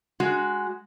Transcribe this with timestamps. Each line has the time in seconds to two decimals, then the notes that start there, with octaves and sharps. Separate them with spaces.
0.20 G#3 F#4